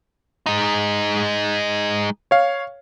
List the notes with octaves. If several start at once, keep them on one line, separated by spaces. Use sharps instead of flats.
G#3 D#4
C#5 F5